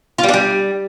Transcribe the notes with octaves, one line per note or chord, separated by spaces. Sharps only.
F4
G3
D4
G3